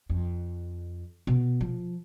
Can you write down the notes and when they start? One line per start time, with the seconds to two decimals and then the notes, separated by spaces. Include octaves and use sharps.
0.10 F2
1.27 B2
1.61 F3